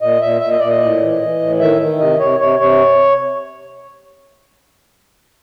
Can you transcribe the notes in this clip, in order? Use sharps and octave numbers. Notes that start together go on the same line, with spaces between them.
A#2 D#5
A#2 E5
A#2 E5
D#5
A#2 D5
D#5
A2
E3
E3
A2
D#3 E5
D#3
C3 D#5
C3 C#5
C3 C#5
C3 C#5